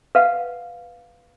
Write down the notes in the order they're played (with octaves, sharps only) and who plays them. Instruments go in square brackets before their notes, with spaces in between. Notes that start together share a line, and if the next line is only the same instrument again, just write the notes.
[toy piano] B4 F5 F#5